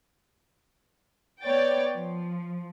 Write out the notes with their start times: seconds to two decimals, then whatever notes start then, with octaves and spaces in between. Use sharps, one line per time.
1.42 B3 C#5 D5 G5 A6
1.95 F3